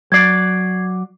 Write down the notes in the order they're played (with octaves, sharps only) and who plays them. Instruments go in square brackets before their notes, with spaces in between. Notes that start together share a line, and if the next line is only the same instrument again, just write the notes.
[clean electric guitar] F#3 D5 [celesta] G#6 C7